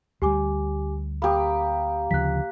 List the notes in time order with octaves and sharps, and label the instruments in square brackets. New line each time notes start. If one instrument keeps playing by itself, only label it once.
[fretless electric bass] D2 G3 [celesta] G4 G#5 D6
[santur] A#3 G4 [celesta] B5 D#6
[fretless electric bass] D2 C#3 F3 [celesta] F#6 B6